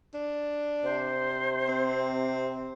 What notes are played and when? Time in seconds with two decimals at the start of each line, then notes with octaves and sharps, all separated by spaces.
0.14 D4
0.84 C3 C5
1.69 C4